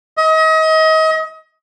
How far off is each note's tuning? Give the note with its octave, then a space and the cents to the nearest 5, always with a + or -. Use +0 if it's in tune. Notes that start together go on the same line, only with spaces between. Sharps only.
D#5 +35